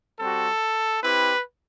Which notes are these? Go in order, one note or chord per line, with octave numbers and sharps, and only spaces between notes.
G3 C4 F#4 A4
C4 E4 G4 B4